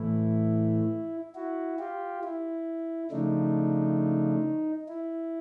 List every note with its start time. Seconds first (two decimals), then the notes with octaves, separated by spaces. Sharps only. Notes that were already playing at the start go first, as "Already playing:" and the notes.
Already playing: A2 E3 A3 E4
1.35 E4 F#4
1.79 F4 G4
2.24 E4
3.11 C#3 F3 A3 D4 D#4
4.89 E4